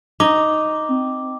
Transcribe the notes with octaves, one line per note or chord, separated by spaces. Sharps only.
D#4 D6
C4